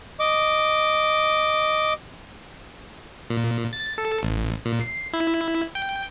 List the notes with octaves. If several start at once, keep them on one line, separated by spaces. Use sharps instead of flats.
D#5 D6
A#2
A6
A4
A1
A#2
C7
E4
G5